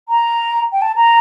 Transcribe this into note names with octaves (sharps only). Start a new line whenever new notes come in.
A#5
G5
A5
A#5